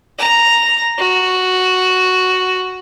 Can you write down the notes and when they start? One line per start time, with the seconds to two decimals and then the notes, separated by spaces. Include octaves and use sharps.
0.19 A#5
0.98 F#4